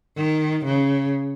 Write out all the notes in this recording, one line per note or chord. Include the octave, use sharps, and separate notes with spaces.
D#3
C#3